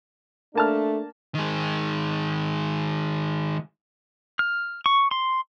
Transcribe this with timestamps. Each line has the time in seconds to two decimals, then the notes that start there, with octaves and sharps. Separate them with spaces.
0.55 A3 A#3 D4 A5 F6
1.35 D#3 G#3
4.39 F6
4.86 C#6
5.11 C6